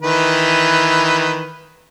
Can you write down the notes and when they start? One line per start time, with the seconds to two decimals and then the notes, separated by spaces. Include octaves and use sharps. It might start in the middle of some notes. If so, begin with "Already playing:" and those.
0.03 D#3 E3 B4